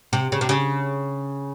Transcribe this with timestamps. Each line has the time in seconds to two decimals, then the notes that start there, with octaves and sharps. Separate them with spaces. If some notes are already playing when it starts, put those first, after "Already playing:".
0.13 C3
0.32 C#3
0.41 C3
0.49 C#3